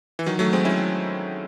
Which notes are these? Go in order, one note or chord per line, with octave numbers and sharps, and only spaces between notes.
E3
D#3 F#3
F#3 A3
G#3 C4
C#4 E4